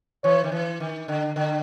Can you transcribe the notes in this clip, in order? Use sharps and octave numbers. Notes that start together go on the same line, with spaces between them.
E3 C#5
D#3
E3
D#3
D3
D3